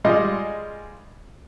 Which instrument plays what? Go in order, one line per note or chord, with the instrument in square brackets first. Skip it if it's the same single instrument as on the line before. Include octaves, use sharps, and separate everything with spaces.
[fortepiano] G3 G#3 F4 D#5